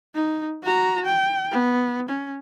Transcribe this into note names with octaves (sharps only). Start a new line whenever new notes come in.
D#4
F#4 A#5
G5
B3
C#4